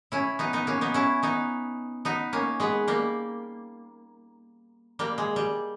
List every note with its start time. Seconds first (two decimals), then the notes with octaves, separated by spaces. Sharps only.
0.12 C#4 E4
0.39 B3 D#4
0.53 B3 D#4
0.67 A#3 C#4
0.81 B3 D#4
0.94 C#4 E4
1.23 B3 D#4
2.05 B3 D#4
2.33 A#3 C#4
2.60 G#3 B3
2.88 G3 A#3
4.99 G3 A#3
5.18 G#3
5.36 G3